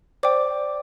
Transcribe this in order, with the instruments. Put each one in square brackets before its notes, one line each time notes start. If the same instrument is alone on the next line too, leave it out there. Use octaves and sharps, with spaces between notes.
[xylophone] C5 D5 G5 D6